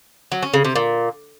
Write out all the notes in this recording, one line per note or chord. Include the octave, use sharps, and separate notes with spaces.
F#3
C#4
C#3
C3
A#2